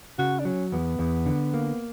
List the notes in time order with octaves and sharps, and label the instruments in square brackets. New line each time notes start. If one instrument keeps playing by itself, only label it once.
[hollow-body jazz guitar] C#3 [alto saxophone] F#4
[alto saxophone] D4
[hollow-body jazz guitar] F#3 [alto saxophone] C#4
[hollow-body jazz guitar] E2 [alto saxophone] B3
[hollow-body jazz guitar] E2
D3
A#3